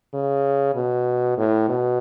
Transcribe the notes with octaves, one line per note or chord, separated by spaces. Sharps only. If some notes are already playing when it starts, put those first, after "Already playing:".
C#3
B2
A2
B2